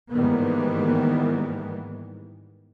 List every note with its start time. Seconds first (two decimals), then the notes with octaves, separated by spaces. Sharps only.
0.13 G#2 D#3 E3 G3 A#3 B3